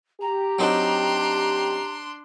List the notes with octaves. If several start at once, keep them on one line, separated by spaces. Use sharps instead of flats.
G4 A#5
F#3 C4 D4 D#4 C6